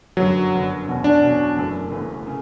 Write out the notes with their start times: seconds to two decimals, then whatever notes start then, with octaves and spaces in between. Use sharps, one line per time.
0.17 G1 F#2 D3 F#3
0.52 G1 F#2 D3
0.87 E2 B2 F#3 C#4 F#4
1.04 D4
1.22 E2 B2 F#3 C#4 F#4
1.56 F#1 F#2 E3 A3
1.91 F#1 F#2 E3 A3
2.27 C#3